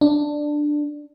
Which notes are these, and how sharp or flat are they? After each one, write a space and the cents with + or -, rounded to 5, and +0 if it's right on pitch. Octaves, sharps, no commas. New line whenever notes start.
D4 +10